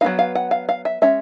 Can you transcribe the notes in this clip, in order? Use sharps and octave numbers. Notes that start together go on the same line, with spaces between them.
F#3 B3 D#4 F5
F5
F#5
F5
F5
E5
G#3 C#4 E5